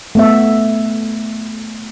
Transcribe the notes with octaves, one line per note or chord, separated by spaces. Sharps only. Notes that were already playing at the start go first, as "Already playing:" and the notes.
A3 B3 E5